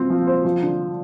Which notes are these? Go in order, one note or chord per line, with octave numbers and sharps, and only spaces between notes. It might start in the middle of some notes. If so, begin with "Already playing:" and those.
Already playing: C4 F4
F3
C5
F3
D3